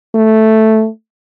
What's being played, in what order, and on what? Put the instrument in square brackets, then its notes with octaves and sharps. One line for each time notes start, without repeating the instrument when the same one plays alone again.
[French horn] A3